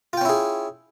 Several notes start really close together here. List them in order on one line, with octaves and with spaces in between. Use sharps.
F4 G5 C#4 E4 G#4